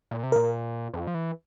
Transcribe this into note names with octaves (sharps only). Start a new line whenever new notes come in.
A#2
C3
A#2 A#4
F2
F3
E3